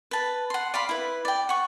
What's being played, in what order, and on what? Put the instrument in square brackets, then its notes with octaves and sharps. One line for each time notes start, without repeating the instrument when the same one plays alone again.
[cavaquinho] B4 A5
F#5 C6
D5 F5 B5 C6
E4 B4
D5 G5
F#5 C#6